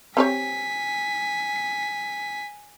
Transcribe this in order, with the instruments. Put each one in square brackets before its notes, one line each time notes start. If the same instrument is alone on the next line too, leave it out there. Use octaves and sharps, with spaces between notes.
[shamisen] C4 G4 C#5 [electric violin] G#5 B6